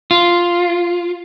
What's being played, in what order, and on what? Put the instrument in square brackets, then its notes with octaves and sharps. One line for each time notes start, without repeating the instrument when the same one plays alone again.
[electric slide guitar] F4